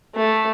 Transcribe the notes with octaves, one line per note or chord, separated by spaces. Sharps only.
A3